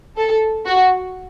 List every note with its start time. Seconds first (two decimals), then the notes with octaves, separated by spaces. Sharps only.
0.17 A4
0.65 F#4